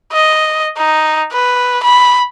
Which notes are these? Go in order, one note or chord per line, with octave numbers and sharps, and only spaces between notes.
D#5
D#4
B4
B5